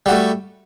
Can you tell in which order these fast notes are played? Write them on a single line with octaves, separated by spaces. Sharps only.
G3 F#4 A3